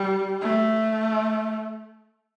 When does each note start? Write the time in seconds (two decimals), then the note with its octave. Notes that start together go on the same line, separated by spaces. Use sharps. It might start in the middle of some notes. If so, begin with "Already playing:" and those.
Already playing: G3
0.41 A3